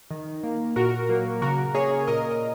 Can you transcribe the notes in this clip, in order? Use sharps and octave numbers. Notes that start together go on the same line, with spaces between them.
D#3
A#3
A#2 F#4 A#4
F#3 A#3
C#3 F#4 A#4
A#3 G#4 C#5
A#2 A#4 D#5